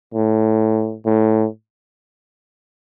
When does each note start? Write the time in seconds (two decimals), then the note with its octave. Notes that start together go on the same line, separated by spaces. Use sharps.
0.14 A2
1.06 A2